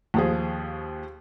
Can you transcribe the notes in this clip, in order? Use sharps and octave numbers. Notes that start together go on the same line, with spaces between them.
D#2 F3 G#4